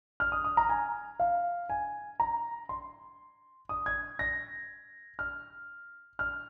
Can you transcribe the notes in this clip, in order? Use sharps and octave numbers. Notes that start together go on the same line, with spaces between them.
F6
D#6
D#6
A#5
G#5
F5
G#5
A#5
C6
D#6
G#6
A#6
F6
F6